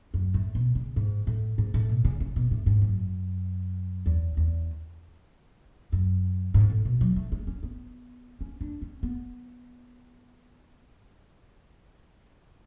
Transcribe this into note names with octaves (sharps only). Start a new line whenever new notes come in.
F#2
A2
B2
C#3
G#2
A2
G#2
A2
B2
C#3
C#3
B2
A2
G#2
F#2
E2
E2
F#2
G#2
A2
B2
F#3
A3
G#3
C#4
B3
C#4
D4
C#4
B3